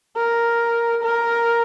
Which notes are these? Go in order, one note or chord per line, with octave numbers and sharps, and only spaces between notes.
A#4
A#4